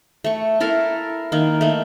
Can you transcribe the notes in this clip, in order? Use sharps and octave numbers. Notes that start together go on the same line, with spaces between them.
A3 C#6
E4 A4 A#4 F5
D#3 A#3
A3 A#3